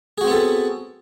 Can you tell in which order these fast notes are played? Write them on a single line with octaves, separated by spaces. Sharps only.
G#4 F#4 C4 B3 A4